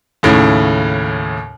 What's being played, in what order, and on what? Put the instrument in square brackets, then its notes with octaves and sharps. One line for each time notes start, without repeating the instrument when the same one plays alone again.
[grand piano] D#2 A2 C#3